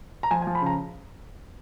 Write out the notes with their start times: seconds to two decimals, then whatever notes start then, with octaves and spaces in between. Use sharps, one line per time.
0.23 A#5
0.31 F3 G#5
0.42 G#5
0.47 F3
0.55 B5
0.62 C#3 A#5